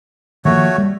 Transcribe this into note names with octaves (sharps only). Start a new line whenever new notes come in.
D#3 F3 A3 A#3 F#4 C#5
G3